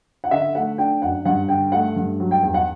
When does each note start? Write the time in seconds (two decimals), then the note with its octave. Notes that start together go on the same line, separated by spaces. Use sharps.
0.24 F#5
0.31 D3 E5
0.55 A3 F#5
0.78 D4 G5
1.02 F#2 F#5
1.25 G2 F#5
1.49 D3 G5
1.72 A3 F#5
1.96 G2
2.20 F#3
2.31 G5
2.43 E2 G5
2.54 F#5